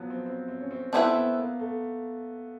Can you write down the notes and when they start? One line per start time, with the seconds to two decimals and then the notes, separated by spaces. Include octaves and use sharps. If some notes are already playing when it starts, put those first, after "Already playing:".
Already playing: F3 F#3 B3
0.10 C4
0.26 C4
0.48 C4
0.61 C#4
0.71 C4
0.93 A3 B3 C4 E4 G#4 B4
1.15 B3
1.37 A#3
1.59 A3